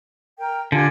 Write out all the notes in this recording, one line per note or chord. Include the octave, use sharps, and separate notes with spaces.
A#4 G5
D3 F4 G4 G#5